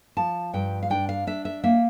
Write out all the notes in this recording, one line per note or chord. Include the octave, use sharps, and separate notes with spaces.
F3 A5
G2 G5
F5
D4 G5
F5
D4 E5
E5
A#3 E5